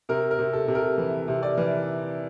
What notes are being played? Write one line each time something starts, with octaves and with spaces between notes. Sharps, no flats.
C3 A#4
A#4
C3
A4
C3
A#4
E3
C3
D5
E3